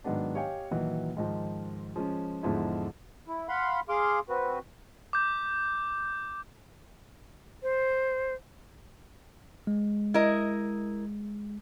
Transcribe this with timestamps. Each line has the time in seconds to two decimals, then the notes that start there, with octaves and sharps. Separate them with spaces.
0.04 G#2 D#3 F#3 G#3 B3 D4
0.35 G4 C#5 D#5 F5 G5 G#5
0.71 A#2 D#3 E3 F#3
1.17 G#2 D#3 F3
1.96 F3 G#3 C#4
2.43 E2 G#2 D3 F3 D#4 E4
3.28 E4
3.49 F5 F#5 B5 C6
3.89 G#4 F5 C6 D6
4.29 C4 F#4 B4
5.13 D6 G6
7.63 C5
9.67 G#3
10.14 E4 A#4 D#5